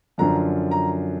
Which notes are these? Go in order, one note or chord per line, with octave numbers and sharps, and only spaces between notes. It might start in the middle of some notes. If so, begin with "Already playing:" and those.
F#2 D3 F3 A#5
A#5